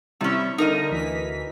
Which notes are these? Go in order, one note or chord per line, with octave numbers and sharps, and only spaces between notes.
C3 G3 C#4 E4 E5
D3 D#4 A#4 D#5
D2 E3 B6